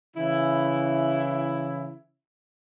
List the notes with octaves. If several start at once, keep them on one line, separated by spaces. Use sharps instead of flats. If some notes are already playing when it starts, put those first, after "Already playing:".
C#3 E3 E4